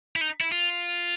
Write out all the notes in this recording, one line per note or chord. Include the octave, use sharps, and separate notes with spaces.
E4
D#4
E4
F4